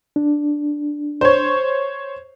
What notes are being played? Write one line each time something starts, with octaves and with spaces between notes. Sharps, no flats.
D4
C5 C#5